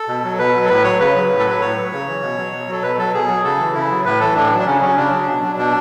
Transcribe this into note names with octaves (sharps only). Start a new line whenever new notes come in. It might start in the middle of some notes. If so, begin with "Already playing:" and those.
Already playing: A4
B2
F#3
B2 B4
F#3
A4
A2 B4
F#3 C#5
C#3 B4
F#3
A2
A4
F#3 B4
A2 C#5
F#3
C#3
E3
B2
F#3
B2
F#3 A4
B2 B4
F#3 A4
B2 G#4
F#3
C#3 A4
E3
C#3 E4
F#3
A2 B4
E3 A4
A2 D4
F#3
D4
C#3 C#4
F#3 C#4
C#3 D4
F#3
B2
F#3
B2 D4